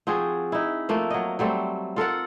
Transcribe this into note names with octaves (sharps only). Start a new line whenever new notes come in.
F3 C4 F#4 G#4
D#4 E4
F3 A3 A#3
F#3 D#5
F#3 G3 A3 C4
F4 A4 A#4 F#5